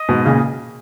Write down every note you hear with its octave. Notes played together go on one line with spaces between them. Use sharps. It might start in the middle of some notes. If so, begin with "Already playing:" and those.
Already playing: D#5
G#2 B2
A#2 C#3